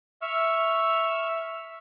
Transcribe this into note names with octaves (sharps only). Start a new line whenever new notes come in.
E5 C#6 E6 F6